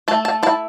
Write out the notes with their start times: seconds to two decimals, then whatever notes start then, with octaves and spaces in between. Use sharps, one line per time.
0.08 A3 A5
0.25 A5
0.43 E4 A5